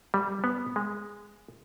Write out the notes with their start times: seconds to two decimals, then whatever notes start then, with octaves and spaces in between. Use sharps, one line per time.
0.14 G3
0.44 B3
0.76 G#3